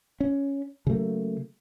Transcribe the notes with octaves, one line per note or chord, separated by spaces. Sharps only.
C#4
C#3 F#3 A3 A#3